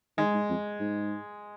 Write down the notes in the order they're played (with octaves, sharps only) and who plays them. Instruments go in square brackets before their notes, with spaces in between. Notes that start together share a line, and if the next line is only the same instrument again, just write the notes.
[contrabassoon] D#3 [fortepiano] G#3
[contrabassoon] G#2
F2
G#2